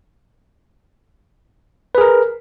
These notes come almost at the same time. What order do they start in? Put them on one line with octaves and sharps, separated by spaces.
B4 G#4 A#4